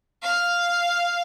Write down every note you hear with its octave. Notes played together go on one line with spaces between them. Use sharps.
F5